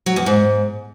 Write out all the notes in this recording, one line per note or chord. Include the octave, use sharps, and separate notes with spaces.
F#3
E2
G#2